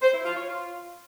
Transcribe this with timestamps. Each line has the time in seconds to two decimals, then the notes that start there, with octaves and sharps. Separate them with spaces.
0.02 C5
0.13 E4
0.25 F4
0.37 C#5
0.48 F4